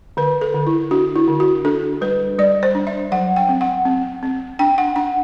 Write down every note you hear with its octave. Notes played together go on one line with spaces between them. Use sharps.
D3 B4
A4
D3
E4
D4 F#4
E4
D3
F#4
D4 A4
G3 B4
G3 D5
C5
D4
E5
F#3 F#5
G5
C4
F#5
C4
C4
D4 G5
F#5
D4 F#5